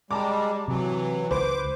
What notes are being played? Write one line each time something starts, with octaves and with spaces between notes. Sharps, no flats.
G3 G#3 A5 A#5 D6
C3 E3 F#3
C#2 B4 C5 D6